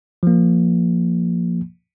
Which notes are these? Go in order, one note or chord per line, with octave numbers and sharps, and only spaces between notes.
F3 A#3